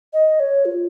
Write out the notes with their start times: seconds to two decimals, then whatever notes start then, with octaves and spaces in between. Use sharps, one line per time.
0.13 D#5
0.40 C#5
0.65 F4